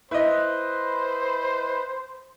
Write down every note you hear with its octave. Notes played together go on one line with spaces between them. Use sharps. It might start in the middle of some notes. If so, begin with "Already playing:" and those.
E4 B4 C5 D#5